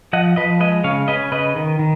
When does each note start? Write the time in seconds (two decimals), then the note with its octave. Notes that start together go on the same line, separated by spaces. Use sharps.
0.13 F3 D#5 F#5
0.36 F3 B4 D#5
0.60 G#3 B4 D#5
0.84 C#3 C#5 F5
1.08 C#4 B4 D#5
1.32 C#3 B4 D#5
1.56 D#3
1.79 D#3